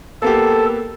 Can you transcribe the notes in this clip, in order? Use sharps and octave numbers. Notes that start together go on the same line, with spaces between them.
A#3 B3 G4 A4